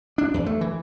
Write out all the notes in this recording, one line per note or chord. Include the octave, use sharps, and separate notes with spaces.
D4
E2
A3
E3